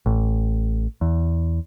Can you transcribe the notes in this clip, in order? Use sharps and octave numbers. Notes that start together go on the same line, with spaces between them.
A1
E2